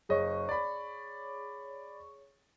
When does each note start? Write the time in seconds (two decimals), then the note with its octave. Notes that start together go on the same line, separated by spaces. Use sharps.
0.09 F#1 G#4 C#5 D#5 C#6
0.49 D5 B5